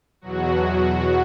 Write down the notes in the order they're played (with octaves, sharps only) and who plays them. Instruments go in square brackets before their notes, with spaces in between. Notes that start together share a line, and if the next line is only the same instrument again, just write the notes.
[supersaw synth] E2 B2 F#3 F#4